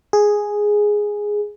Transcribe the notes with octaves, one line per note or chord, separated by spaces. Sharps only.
G#4